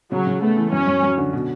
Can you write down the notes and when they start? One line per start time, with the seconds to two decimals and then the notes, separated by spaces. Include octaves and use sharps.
0.11 C#3 F#3
0.27 C#3
0.42 A3 B3
0.57 E3
0.72 F#2 C#4
0.87 F#2
1.03 F#3
1.18 D3
1.33 B2